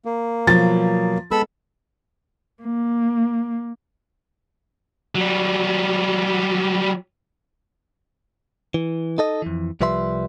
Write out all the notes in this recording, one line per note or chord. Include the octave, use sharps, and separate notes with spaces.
A#3
B2 F3 F#3 A6
G#3 B3 A4 B5 E6
A#3
F#3 G3
E3
D#4 A4 D#5
F2 E3
C2 F3 G3 B4 E5 C6